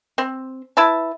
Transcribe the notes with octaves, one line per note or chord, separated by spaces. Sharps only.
C4
E4 B4 E5 A5